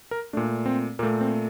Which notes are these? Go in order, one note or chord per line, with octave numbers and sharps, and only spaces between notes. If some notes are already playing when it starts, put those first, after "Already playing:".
A#4
A#2 A3 D4
C4
A#2 A3 A#3
C4